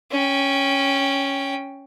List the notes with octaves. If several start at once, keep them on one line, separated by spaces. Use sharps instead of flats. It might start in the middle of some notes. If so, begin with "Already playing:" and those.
C#4 G5